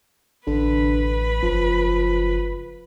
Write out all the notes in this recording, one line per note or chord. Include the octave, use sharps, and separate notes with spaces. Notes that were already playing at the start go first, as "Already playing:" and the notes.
A1 D3 B4 B5
F#1 F3